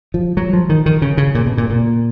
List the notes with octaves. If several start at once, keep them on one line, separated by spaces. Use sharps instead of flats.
F3
F#3
F3
D#3
D#3
C#3
C#3
A#2
B2
A#2
A#2